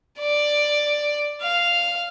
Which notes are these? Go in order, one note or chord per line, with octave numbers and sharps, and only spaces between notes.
D5
F5